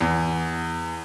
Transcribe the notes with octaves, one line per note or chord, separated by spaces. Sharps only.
E2